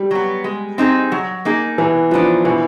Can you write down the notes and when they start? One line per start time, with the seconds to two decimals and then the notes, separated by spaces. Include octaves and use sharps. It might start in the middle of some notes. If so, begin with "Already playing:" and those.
Already playing: G3
0.11 F#3 B3
0.44 G#3
0.78 C4 D#4 G#4
1.12 F#3
1.45 A#3 D#4 G#4
1.78 B2 E3
2.11 F3 F#3 B3 D4
2.45 B2 E3